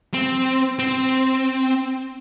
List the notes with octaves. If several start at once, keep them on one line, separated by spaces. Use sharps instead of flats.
C4
C4